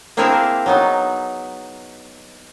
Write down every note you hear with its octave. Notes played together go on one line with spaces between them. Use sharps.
A#3 C4 D4 E4 G#4 A#4
F#3 B3 D#4